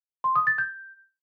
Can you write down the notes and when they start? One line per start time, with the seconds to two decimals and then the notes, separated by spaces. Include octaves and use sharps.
0.24 C6
0.36 D#6
0.47 A6
0.58 G6